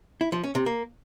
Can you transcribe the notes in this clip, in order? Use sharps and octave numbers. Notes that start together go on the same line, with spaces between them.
E4
F3
C#4
C3
A#3